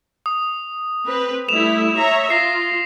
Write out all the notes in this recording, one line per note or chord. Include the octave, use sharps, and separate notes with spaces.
D#6
C4 B4
G3 A3 E4 E7 F7
C#5 E5 A#5
F4 A#6 C7